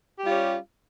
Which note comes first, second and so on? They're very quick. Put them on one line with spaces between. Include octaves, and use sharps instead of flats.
G4 G3 F4 C#4